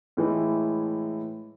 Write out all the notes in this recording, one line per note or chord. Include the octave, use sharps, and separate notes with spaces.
A2 E3 G#3